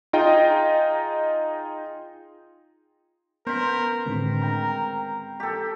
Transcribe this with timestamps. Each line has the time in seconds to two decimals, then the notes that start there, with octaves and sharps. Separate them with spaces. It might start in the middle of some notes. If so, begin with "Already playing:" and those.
0.13 D#4 F4 G#4 D#5 G5 A#5
3.47 B3 C#4 A#4 C5 B5
4.06 A2 D3 D#3 G#3 C4 A#4
4.42 G5 A#5
5.40 G4 A4